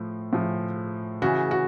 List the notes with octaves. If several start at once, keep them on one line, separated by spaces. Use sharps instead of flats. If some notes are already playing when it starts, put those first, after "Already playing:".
Already playing: A2 F3
A2 F3
C#3 E3 F#4
F#4